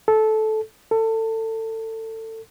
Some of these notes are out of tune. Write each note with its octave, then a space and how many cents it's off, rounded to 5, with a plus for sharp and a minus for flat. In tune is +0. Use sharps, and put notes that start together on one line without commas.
A4 -15
A4 +25